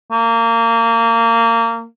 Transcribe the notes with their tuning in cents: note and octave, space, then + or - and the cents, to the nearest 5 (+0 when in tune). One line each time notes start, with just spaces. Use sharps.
A#3 -25